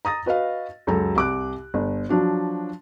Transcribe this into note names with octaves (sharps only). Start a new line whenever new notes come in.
A#5 D#6 A6 A#6
F#4 B4 D#5 F5
C#2 F#2 A4 A#5
C2 D6 F#6
G1
F3 F#3 D4 F#4